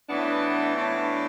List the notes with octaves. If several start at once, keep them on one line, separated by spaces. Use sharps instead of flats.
A2 E3 B3 D4
A2 E3 B3 D4